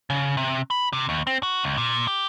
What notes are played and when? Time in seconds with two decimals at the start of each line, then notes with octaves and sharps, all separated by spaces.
0.10 C#3
0.37 C3
0.71 B5
0.93 C3
1.09 D#2
1.27 C4
1.43 F#4
1.64 C#2
1.77 A#2
2.07 G4